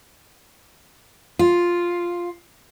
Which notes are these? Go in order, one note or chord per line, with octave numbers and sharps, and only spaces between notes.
F4